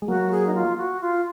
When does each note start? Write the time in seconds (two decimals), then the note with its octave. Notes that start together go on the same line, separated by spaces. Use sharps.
0.02 G#3
0.08 F#3 A#3 F#4
0.31 G#4
0.47 D#4
0.55 F4
0.77 F#4
1.01 F4